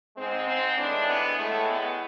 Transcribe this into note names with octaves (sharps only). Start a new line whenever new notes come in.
G#2 G#3 C4
C4
A2 E3 G#3 D4
B3
A2 G#3 A3
B3